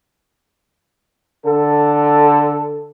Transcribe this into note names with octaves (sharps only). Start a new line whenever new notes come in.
D3 A4